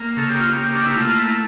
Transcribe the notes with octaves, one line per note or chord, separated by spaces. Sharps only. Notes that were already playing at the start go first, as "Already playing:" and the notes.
Already playing: A#3
C#3 A4
G4
F4
G4
A#3
D4
E4
A3 F4
E4